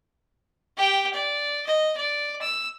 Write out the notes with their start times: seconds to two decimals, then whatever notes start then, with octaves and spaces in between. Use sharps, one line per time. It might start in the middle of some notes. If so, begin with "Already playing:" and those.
0.77 G4 G5
1.14 D5
1.66 D#5
1.97 D5
2.42 E6